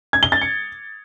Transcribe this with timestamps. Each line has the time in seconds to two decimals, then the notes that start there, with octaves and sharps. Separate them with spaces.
0.13 G#6
0.23 G7
0.32 A6
0.42 C#7